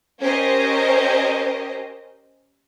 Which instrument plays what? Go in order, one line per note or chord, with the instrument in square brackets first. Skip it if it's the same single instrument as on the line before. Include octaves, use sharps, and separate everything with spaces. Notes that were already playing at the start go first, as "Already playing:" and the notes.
[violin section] C#4 G4 A#4 C5 D#5